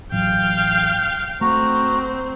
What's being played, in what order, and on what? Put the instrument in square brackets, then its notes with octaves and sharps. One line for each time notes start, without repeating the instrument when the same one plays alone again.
[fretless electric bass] A1 F#3 [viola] F5 G5
[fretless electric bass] A3 [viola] C4 [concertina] F#4 A#5